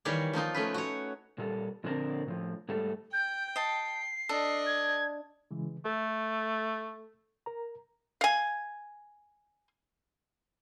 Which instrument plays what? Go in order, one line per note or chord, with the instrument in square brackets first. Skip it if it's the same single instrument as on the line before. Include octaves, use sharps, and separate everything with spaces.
[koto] D#3 E3 G3 A#3 C#5 D5
F3 A#3 D#4 F4
A3 C#4 B4
F#4 C#5
[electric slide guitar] A#2 G3 A4
A#2 D3 F3 C4 D4 A#4
A2 D#3 F3
G#2 G3 A3 A4
[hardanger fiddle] G5 [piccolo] G6
[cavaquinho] D#5 A5 [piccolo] C7
[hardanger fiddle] D4 D#5 [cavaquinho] A4
[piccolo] G#6
[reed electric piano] C#3 E3 G#3
[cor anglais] A3 [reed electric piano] A4
[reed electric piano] A#4 A#5
[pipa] F5 G#5